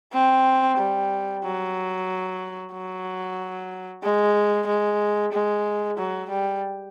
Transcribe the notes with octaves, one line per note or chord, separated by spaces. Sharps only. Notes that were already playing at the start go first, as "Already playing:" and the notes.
C4
G3
F#3
F#3
G#3
G#3
G#3
F#3
G3